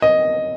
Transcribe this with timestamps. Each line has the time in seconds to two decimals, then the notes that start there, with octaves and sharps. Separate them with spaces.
0.02 D#5